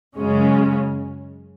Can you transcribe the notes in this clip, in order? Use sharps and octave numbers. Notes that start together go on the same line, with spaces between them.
F#2 C#3 G#3 C#4